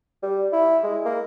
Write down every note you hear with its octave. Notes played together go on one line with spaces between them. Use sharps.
G3
E4
G#3
A#3